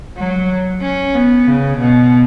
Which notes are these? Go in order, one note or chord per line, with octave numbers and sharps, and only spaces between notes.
F#3
C#4
B3
C#3
B2